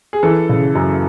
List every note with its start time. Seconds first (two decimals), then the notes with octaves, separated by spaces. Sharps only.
0.13 G#4
0.23 E3 A4
0.49 C#3
0.75 F#2